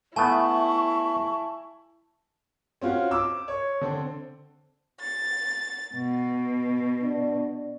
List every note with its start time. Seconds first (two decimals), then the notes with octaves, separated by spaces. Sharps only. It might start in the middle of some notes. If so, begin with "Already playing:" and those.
0.16 A3 B3 E4 G#5 A5 C#6
2.82 C4 C#4 F4 F#4
3.11 D6 E6
3.48 C#5
3.81 D3 C4
5.01 A6
5.95 B2
7.02 D4